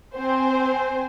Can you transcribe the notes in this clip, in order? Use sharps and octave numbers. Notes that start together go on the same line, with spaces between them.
C4 C5 G#5